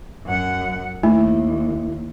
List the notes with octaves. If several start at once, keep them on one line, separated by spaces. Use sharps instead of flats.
F#2 F#5
D#2 A3 E4